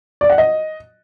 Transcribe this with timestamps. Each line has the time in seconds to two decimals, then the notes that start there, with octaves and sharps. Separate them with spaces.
0.21 D5
0.30 F#5
0.38 D#5